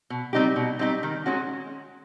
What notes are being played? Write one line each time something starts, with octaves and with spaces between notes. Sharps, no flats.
B2
G3 C4 D#4 G4
B2
G3 C4 D#4 G4
D#3
G#3 C#4 F#4